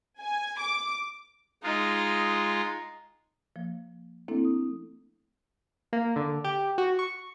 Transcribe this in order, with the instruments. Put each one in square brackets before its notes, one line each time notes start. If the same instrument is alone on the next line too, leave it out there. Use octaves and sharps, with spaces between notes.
[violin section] G#5
D6
[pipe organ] G#3 F4 [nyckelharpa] D#4
[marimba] F3 A#3
A3 A#3 C4 D4 E4 A4
D#6
[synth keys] A#3
D3
G4
F#4
C#6